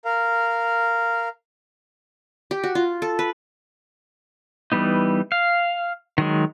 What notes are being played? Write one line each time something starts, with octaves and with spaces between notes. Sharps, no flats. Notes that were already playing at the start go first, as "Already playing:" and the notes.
A#4 F5
G4
F#4
F4
A4
B4
E3 G3 B3 D#4
F5
D#3 F#3 G#3